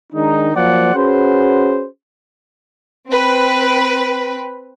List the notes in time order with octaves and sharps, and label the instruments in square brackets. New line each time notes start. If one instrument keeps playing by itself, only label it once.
[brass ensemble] D#3 G#3 D4 D#4
F3 F#3 A#3 C5 D5 F#5
C#4 F#4 G#4 B4 C5
[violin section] C4 B4